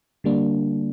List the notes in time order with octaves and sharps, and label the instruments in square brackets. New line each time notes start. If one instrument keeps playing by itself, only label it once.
[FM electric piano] D3 G3 A#3 D4